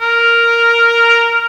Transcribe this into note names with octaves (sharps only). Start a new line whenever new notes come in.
A#4